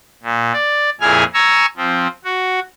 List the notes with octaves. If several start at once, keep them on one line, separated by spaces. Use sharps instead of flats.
A#2
D5
F2 A#2 E4 G#4 G#5 F6
G#5 A#5 C#6 E6
F3 C4
F#4